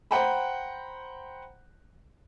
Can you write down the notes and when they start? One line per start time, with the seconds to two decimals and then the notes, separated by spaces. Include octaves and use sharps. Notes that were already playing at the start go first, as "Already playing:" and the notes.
0.11 C5 F#5 G5 A#5 B5